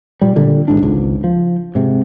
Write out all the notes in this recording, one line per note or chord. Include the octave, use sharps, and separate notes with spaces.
A#2 G3
A#2 D3 G3
D1 A1 G#2 D4
G#1 C#2 G#2
F3
G#2 C3